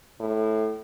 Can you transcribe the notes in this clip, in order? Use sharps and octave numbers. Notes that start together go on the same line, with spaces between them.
A2